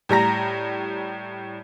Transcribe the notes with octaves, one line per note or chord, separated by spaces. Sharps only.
A2 G3 A#5 A#6